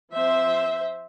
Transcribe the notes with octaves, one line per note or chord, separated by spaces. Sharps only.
F3 C4 C5 E5